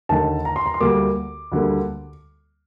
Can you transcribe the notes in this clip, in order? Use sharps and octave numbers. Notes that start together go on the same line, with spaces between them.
D#2 D3 A3 D#4 A5
A#5
C6
A#5
C6
D2 D3 G3 A#3 D6
D2 D3 G3 A#3